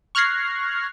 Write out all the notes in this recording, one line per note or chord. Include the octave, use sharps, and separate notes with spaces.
C#6 F6 F#6 G#6 A#6 C7